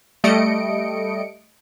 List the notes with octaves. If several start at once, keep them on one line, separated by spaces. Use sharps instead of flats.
G3 A3 D#5 C#7 D7